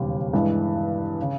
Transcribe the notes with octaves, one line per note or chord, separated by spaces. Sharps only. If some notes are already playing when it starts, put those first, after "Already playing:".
Already playing: E1 D#2 C#3 G3
G2 E3 G#3
C#3